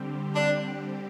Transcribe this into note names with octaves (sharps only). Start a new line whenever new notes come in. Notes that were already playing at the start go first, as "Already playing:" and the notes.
Already playing: D3 G3 C4 G4
D4